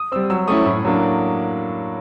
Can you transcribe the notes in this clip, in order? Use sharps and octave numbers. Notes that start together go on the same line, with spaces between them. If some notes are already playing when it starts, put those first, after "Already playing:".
Already playing: D#6
G3 C4 E6
F#3 E6
A3 C#4 E4 D#6
A2
F#3 A#3 D4